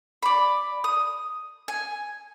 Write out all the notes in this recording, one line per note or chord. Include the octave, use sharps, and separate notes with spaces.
D5 B5
D#6
G#5